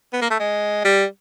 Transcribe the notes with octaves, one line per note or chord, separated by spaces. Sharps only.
B3
A#3
A3
G#3
G3